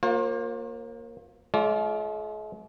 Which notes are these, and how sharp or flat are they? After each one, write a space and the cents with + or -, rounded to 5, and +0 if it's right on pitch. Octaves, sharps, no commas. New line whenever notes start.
A#3 +0 F4 +35 C5 +45
G#3 +45 F4 +0 D5 -35